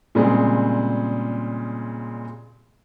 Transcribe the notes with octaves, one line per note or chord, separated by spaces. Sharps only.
A#2 C#3 G3 G#3 C4 G#4